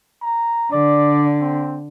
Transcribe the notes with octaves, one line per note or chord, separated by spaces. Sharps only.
A#5
D3 D5
C4